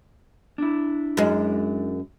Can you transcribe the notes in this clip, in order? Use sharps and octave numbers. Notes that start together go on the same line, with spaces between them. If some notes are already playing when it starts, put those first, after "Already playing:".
D4 E4
F#2 G#3